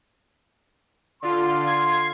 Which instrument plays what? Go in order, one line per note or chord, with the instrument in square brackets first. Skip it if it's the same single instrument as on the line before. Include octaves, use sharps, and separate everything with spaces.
[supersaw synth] D3 F4 [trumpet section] C6
[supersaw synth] G#6 C7